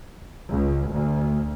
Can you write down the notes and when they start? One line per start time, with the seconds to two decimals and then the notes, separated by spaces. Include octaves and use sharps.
0.50 C#2
0.93 D2